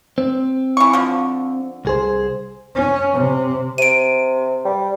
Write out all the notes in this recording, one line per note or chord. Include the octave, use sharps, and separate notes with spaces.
C4
E3 C#6
D3 F3
C2 G#4 C5
C#4
C3
C3 D7 D#7
G3